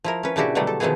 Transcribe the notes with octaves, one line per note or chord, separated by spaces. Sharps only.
F3 E4 A#4
C#4 B4
A#2 C#3 D4 E4 F#4 G4
B2 D3 F#3 G3 A3
A4
B2 D#3 F3 A3 B3 G#4